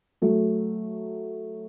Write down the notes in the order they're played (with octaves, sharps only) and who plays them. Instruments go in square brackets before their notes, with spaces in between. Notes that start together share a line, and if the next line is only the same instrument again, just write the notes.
[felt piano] F#3 A3